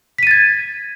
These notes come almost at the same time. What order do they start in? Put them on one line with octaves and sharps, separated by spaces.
B6 D#7 A6 G#6